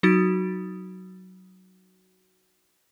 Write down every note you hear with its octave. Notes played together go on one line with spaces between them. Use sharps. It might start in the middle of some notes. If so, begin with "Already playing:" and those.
F#3 D#4 F#4 D#6 A6 D7